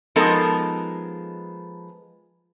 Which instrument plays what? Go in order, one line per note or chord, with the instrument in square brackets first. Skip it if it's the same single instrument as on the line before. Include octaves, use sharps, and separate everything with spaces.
[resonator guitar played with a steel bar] F3 G#3 B3 D#4 A4 A#4